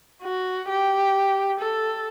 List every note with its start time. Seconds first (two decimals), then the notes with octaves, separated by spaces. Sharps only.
0.23 F#4
0.68 G4
1.60 A4